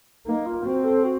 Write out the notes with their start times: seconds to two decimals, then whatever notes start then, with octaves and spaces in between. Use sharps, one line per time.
0.26 A#3 D#4
0.46 F4
0.65 C4 F#4
0.84 A4
1.04 F#4